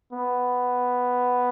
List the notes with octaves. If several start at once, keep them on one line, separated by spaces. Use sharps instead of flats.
B3